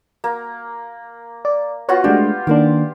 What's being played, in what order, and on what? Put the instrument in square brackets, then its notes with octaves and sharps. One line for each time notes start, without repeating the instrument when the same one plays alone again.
[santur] A#3
[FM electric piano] D5
[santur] B3 F4 F#4 [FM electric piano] C#5
[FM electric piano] G#3 A3 D4 [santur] G4
[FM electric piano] D#3 A#3 D4 [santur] C6 D6